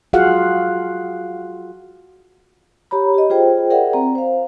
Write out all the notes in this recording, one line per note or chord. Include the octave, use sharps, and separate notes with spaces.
F4 F#4 G#4 F5 F#5
G4 C#5 A#5 B5
G4 D#5
F4 G#4 C5 G5
G#4 A#4 D5 E5 F#5 G5
C4 A#5
C5 F5